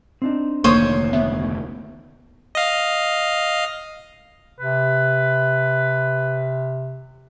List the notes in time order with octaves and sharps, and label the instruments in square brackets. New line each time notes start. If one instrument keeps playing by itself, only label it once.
[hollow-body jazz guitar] C4 D4 D#4
[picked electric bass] F1 D2 D#3 [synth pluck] A#3 [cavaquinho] C5 C#5 D#6
[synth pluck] B3 [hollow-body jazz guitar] E5
[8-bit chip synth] D#5 F5
[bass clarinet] C3 [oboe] B4